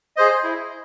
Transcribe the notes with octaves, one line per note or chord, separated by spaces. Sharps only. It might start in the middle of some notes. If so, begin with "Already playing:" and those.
G#4 C5 D#5
E4